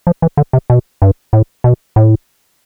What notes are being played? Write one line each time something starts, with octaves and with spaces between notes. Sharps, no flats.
F3
E3
D3
C3
B2
G2
A2
B2
A2